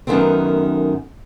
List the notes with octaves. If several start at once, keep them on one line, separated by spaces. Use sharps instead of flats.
F#2 D#3 A3 B3 C4